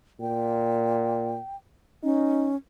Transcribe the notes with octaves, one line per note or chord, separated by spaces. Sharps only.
A#2 G5
C#4 D#4